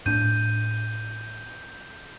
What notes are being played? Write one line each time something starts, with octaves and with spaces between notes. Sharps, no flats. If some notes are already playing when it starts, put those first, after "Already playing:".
A2 D4 G6 D#7